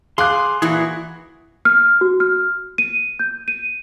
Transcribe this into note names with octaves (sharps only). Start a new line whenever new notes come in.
G#4 F5 C6 D6 F#6
A#2 E3 E4 F#4 G#4
F6
F#4
F6
D#7
G6
D#7